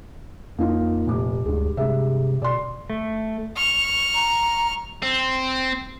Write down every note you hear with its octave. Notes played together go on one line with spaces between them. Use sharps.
F2 A#3 D#4 F4
F1 A#2 G4 D6
D2 G2 G#3
G2 C3 G#3 E5
B2 D5 C6
A3
C#6 F6
A#5
C4